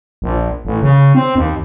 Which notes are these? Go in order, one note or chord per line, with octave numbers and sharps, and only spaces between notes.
A#1
A1
C#3
C4
D#2